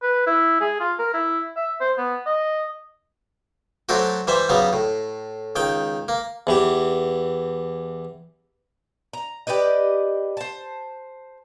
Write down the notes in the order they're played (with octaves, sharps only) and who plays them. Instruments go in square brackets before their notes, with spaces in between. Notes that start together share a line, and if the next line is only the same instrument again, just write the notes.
[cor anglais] B4
E4
G#4
F4
A#4
E4
E5
C5
B3
D#5
[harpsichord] F#3 A3 C4 D4 F#4
E3 G3 C5 E5
C#3 F#3 G3 B3
A2
C#2 D#3 G5
A#3
E2 E3 G4
[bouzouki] A#5
G4 B4 D5 D#5
C5 A5